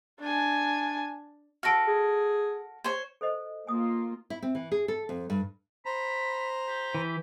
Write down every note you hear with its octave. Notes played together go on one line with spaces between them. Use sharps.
D4 G#5
F#4 A4 F6 A#6 D7
G#4
C5 C#5
A4 C5 D#5
A#3 F4 G#5 D#6
E4
C4
E3
G#4
A4
F2
G2
C5 A#5 B5
G4
E3